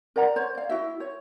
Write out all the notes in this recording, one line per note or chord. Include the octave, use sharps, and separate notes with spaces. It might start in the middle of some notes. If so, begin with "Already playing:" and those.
A#4 D5 F#5 A#5
C5 C#5
D5 F5
E4 F#4 E5
C#5